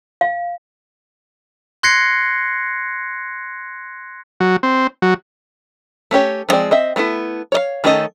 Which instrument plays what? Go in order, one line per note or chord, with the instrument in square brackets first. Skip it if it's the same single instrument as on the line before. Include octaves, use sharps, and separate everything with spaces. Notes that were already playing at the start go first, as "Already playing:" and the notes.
[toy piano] F5
[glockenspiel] C6 F#6 G#6 A#6 C7 C#7
[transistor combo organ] F#3
C4
F#3
[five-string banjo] A3 C#4 G4 C#5
E3 F3 G#3 C4 D5
C4 D#5 E5
G3 A3 B3 E4
C#5 D5 F5
D#3 A3 C#4 A4 D#5